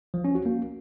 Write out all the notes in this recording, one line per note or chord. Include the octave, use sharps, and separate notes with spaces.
F3
C#4
F#4
A#3